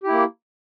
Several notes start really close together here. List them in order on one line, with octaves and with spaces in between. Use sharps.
G4 E4 A#3